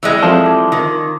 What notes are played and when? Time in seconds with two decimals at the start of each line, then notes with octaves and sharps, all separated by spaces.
0.03 E3 G3 G#3
0.23 F3 C4 A4 E5
0.45 C6 D6 G#6
0.72 D#3